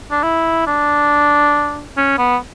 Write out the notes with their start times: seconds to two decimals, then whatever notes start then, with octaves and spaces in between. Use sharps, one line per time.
0.11 D4
0.23 E4
0.67 D4
1.97 C#4
2.18 B3